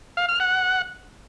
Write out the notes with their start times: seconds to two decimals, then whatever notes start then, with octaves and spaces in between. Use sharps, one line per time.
0.17 F5
0.28 F6
0.40 F#5